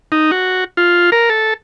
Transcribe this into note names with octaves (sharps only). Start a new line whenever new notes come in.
D#4
F#4
F4
A#4
A4